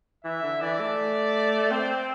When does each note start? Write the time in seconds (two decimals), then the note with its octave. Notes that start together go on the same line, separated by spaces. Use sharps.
0.25 E3 E5
0.43 D3
0.61 E3 D5
0.80 A3
1.71 C4 C5